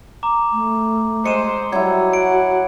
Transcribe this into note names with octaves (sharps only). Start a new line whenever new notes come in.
A#5 D6
A3
G#3 C5 C#7 D#7 E7
F#3 G3 E4 F#4 G#6
F#5 C#7 D7